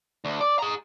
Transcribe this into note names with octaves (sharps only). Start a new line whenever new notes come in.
D2
D5
G#4 A#5